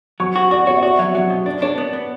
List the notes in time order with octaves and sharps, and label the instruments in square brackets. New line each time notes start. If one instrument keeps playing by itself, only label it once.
[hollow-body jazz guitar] F#3 [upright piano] C#6
[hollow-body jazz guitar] F#4 [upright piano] C#6
[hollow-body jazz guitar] F#4 [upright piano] D5
[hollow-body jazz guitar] F#4 [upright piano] C#5
[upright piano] E5
[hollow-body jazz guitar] F#4 [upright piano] D5
[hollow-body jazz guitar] F#3 [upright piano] E5
[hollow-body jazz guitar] F#3 [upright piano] F#5
[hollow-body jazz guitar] B2
[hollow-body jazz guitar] D4 [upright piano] D5
[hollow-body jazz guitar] D4 [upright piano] C#5
[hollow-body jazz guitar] B3
B3